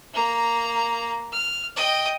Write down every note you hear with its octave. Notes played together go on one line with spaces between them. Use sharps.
A#3 A#5
F6
D#5 G5